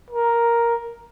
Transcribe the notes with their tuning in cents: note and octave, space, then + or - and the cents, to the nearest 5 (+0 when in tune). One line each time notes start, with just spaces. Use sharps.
A#4 +5